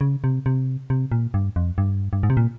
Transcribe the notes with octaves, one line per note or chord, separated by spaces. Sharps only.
C#3
C3
C3
C3
A#2
G2
F2
G2
G2
G#2
C3
A#2